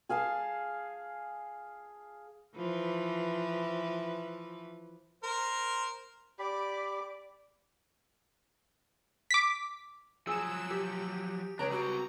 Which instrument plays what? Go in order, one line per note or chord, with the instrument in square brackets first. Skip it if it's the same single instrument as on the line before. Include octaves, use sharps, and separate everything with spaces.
[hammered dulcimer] G#4 F5 G#5 A5
[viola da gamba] E3 F3 B4
[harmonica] A#4 C5
[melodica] G4 B5 [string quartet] D5 D6
[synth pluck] D6 B6
[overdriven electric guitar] F3 F#3 [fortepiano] G#4 [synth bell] E6 E7
[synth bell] G4
[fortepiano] C#2 [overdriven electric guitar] D4 [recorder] C#5 [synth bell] A#5
[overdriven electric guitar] G3 C4 [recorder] F#4